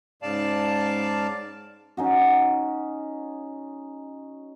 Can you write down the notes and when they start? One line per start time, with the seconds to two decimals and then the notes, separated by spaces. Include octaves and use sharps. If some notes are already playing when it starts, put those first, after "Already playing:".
0.22 G#2 C#3 D5 F5 A5
1.97 C#4 D#4 F#4